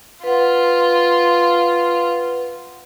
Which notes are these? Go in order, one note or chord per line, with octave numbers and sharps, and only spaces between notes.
F4 B4 F#5